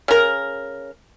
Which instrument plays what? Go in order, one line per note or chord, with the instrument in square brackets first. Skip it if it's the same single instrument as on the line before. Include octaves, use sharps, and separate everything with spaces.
[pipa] C#3 A#4